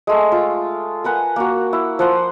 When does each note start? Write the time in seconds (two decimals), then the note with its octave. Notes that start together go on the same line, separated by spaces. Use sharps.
0.07 G#3 A3
0.32 F4
1.04 A#4 B4 F#5 G#5
1.36 A#3 F#4
1.73 E4
1.99 F3 F#5 C6